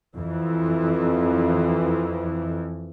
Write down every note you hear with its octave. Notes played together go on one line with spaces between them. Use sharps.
F2 E3